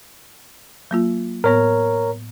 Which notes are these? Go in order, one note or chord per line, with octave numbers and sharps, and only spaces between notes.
F#3 A#3 F4
A2 B3 A#4 C#5 A#5